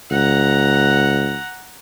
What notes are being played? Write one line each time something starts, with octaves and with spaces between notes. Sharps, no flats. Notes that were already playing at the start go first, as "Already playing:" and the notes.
C#2 F#5 A#5